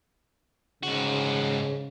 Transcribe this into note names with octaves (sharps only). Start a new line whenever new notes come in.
G#2 C#3 F#4